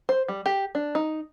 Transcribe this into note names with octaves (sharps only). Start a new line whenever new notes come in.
C5
G3
G4
D4
D#4